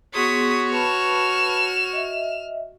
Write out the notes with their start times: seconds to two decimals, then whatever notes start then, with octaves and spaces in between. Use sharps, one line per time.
0.14 B3 F#4 G#4 C#5 C6 D#6 B6
0.71 B4 A5 B5 F6 E7
1.93 D#5 E5